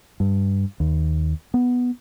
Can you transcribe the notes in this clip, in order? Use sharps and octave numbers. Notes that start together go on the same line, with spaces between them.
G2
D#2
B3